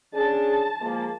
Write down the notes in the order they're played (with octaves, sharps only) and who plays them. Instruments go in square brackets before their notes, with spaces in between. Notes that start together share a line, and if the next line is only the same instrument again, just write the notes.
[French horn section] C#4 D4 G#4 [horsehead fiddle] A5
[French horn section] F3 G#3 A#3